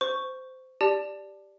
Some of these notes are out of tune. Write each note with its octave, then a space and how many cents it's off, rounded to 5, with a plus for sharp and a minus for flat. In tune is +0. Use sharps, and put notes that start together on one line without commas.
C5 -20 C#6 +0
G4 +0 D5 +0 A5 +0